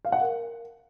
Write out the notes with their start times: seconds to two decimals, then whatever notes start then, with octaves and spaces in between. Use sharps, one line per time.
0.05 F5
0.12 F#5
0.20 A#4